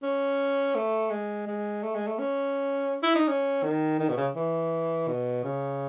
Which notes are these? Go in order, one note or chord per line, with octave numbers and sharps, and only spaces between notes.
C#4
A3
G#3
G#3
A3
G#3
A3
C#4
E4
D#4
C#4
D#3
D#3
B2
C#3
E3
B2
C#3